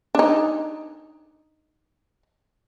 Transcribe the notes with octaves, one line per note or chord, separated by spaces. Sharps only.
D4 D#4